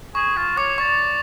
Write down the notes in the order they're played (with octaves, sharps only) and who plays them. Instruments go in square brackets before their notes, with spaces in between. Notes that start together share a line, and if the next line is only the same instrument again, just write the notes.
[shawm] G#4 [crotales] C#6
[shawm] F4
[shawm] C#5 [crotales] D6
[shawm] D5 [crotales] C#6